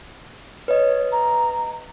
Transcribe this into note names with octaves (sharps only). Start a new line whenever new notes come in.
B4 C#5 D#5
A#5